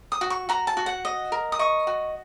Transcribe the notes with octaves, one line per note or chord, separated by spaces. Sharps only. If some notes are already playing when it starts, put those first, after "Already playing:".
D#6
F#4
C#6
F#4 A#5
A5
F#4
F#5
D#5
A#4
D#6
D#5 C#6
F#4